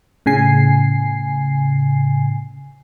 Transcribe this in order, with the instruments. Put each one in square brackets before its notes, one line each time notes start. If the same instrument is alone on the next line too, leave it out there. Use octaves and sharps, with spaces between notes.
[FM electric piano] A2 C#3 G#5 C7